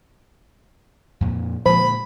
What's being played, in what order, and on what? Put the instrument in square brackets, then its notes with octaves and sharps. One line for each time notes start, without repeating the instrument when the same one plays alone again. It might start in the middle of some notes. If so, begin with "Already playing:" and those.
[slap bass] F2 A#2
[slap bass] A#2 D3 G#3 [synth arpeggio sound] F3 [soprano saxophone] B5